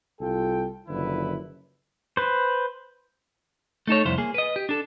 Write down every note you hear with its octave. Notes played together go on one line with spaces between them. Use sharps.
C2 F4 A4 G5
F#1 D3 F3 E4 B4
B4 C5
A3 D#4 A4 C#5
C2 F2 E4 C5
A#3 G#4
B4 D#5
G4
D4 A4